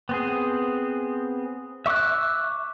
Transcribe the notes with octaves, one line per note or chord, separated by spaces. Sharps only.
B3 C4 G#4
E5 C#6 D6 E6 F#6